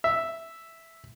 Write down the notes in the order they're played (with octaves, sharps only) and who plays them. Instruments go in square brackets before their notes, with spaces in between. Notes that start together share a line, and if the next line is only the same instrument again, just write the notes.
[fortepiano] E5